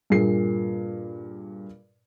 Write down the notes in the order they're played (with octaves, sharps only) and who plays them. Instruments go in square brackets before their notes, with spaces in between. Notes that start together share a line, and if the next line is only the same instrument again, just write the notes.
[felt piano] G2 A#2 G#4 C7